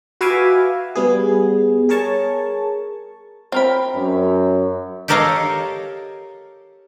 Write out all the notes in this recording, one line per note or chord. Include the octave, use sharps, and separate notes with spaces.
F#4 B4 E5 F5 G#5 D6
G3 B3 G#4
G#4 A#4 C#5 A5 C#6
C4 A#4 B5
F#2
G4 A4 A#4 C#5 D#5 F5